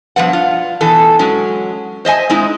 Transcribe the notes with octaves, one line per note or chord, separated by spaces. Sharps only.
G2 B2 F3 B4 F#5
F4
B2 E3 A4
F#3 G#3 C#4
C5 D#5 E5 G#5
G#3 C4 D#4 E4